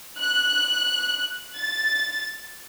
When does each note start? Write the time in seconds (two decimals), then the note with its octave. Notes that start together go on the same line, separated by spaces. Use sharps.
0.19 F#6
1.57 A6